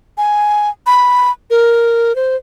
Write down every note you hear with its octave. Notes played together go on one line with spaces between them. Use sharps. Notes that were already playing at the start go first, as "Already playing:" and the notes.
G#5
B5
A#4
C5